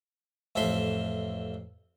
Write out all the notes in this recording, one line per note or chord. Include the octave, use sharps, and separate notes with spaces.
A1 F2 A4 E5 C6